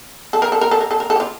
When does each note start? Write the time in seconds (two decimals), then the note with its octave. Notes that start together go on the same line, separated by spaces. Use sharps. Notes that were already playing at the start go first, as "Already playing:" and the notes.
0.33 A4
0.42 A#4
0.52 A4
0.61 A#4
0.71 A4
0.81 A#4
0.91 A4
1.00 A#4
1.10 A4
1.16 G4
1.20 F4